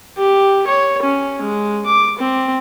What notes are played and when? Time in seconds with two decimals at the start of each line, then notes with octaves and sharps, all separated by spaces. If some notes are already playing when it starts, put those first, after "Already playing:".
0.17 G4
0.66 C#5
1.02 C#4
1.42 G#3
1.86 D6
2.18 C4